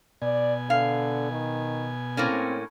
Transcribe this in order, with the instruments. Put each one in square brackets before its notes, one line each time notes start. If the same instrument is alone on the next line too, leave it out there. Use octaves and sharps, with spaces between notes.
[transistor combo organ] B2 G#5 [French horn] D5
[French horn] D3 [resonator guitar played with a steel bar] F5
[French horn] D#3
[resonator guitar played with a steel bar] A2 A#3 C#4 [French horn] C4